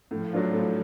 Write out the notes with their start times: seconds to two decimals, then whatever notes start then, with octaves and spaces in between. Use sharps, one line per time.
0.11 A2 F3
0.33 F#3 A3 D4 F4
0.53 A2